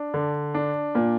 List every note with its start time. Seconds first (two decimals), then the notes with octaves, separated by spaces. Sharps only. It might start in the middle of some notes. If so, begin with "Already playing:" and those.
Already playing: D4
0.14 D3
0.54 D4
0.95 A#2